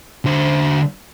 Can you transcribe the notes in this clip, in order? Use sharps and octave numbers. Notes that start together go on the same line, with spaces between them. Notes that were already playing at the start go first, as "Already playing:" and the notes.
D3 C5